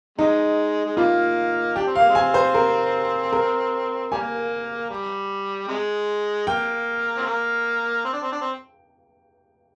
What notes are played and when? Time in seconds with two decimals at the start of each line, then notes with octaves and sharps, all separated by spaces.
0.18 C3 G#3 D#4
0.85 G#3
0.97 G3 A#3 F4
1.76 D4 G4
1.87 C4
1.96 F5
1.99 A#3
2.10 G#3 C4
2.15 G#5
2.34 C5
2.55 A#4
3.33 A#4
4.12 G3 A#3 G#5
4.90 G3
5.68 C3 G#3
6.47 A#3 G5
7.17 C4
7.26 A#3
8.05 C4
8.13 D4
8.23 C4
8.32 D4
8.41 C4